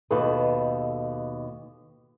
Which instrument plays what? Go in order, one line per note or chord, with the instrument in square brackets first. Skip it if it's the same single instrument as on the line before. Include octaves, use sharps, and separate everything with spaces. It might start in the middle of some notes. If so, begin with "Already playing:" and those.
[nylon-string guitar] D#2 B2 A4 B4